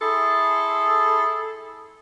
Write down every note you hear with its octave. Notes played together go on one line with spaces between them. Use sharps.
E4 G#4 A4 C6